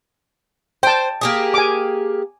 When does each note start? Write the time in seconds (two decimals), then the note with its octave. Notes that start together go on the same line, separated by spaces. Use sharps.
0.83 C5 G5 A5
1.21 A#3 G4 G#4
1.54 G#5 D6